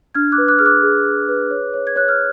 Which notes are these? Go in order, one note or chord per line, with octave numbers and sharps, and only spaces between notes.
D4 F6 G#6
D6 F#6
B4
D6 F#6
G#4 F6
D6 F#6
G#4
G#4
B4
C#5
C#5
G#6
C#5 F#6
F6